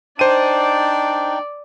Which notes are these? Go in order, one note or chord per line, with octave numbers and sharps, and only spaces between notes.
D4 D#4 C5 D5 G5 D#7